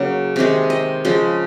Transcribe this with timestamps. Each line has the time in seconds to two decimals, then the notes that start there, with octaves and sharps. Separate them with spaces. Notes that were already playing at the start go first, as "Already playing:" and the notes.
Already playing: C#3 F#3 A#3
0.36 C3 D#3 G#3
0.70 D#5
1.05 C#3 F3 G#3